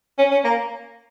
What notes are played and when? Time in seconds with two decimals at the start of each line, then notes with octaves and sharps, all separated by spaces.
0.19 C#4
0.31 C#4
0.45 A#3